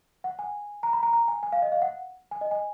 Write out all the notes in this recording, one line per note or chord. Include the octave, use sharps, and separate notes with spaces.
F#5
G#5
A#5
B5
A#5
A#5
G#5
G#5
F5
D#5
F5
F#5
G#5
D#5
G#5